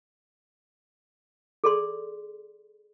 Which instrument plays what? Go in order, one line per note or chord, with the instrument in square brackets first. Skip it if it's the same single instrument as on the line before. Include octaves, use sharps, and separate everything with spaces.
[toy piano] G#4 A4 D5 C6